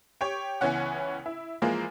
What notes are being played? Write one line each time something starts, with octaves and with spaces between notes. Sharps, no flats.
G4 C#5 G5
C#2 E3 B3 C#4 F#5
E4
E3 F3 G#3 A#3